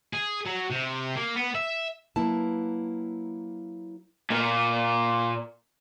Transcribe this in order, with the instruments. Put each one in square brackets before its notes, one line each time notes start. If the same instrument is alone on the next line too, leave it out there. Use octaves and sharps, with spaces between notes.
[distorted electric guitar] G#4
F#3
C3
A#3
B3
E5
[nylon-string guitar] F#3 A#3 E4 B4 A5
[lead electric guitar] A#2 A#3